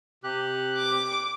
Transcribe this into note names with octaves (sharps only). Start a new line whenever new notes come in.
C3 G4 F#6
D6